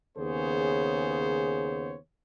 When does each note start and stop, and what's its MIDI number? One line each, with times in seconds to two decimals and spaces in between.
0.18 1.96 39
0.18 1.96 49
0.18 1.96 59
0.18 1.96 68
0.18 1.96 72
0.18 1.96 73